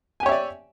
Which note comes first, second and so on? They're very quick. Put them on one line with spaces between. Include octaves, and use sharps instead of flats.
G#5 G4 C#5 E5 D5